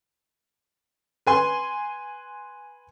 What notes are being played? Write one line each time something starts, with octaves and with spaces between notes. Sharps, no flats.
B4 G#5 C6